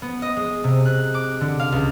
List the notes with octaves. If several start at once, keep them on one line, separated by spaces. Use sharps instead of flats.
B3
D#5
G#3
C3
F#6
D6
D3
F5
C#2